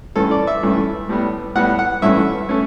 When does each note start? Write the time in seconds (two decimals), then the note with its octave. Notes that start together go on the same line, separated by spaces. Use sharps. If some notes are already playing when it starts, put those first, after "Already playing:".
0.16 G2 E3 A3 C#4 A4
0.31 D5
0.47 E5
0.63 G2 E3 A3 C#4
1.09 A2 G3 B3
1.55 A2 G3 B3 F#5
1.79 F#5
2.02 G2 E3 A3 C#4 E5
2.49 A3 C#4